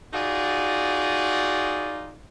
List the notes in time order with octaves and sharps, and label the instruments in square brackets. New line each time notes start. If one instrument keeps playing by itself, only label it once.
[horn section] D#4 F4 F#4 G#4 D5